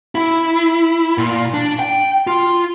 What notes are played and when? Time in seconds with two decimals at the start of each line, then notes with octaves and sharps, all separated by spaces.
0.15 E4
1.18 A#2
1.54 D4
1.79 G5
2.27 F4